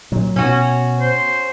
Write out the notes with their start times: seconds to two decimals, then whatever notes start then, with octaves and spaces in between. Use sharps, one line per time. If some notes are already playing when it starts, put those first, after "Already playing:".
0.12 A#2 F#3
0.36 B2 C#4 F#4
1.01 C5